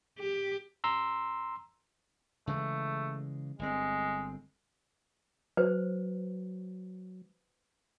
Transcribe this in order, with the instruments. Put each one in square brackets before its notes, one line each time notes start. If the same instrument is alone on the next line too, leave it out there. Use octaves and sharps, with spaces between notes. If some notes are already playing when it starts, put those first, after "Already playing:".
[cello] G4
[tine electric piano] A#5 C6 E6
[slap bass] C#3 E3 G#3 [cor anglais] A3
[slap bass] G1 C4 [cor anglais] G#3
[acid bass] F#3 [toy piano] B4 C5